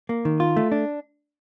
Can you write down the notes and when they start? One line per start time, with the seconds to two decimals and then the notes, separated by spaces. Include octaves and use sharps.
0.09 A#3
0.25 D#3
0.40 F4
0.57 A3
0.72 D4